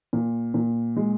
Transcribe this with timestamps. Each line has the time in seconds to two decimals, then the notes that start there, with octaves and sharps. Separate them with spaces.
0.13 A#2
0.54 A#2
0.96 G#3